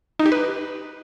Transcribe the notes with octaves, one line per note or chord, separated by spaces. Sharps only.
D#4
G4
B4